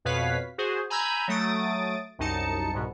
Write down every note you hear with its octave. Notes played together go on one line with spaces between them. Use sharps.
F2 B2 B4 C#5 F5 B6
F#4 G#4 C5
G#5 A#5 B5 E6 G6 G#6
F#3 A3 D#6 A6 D7
C2 F#2 D#4 A5 C#7
C2 G#2 B2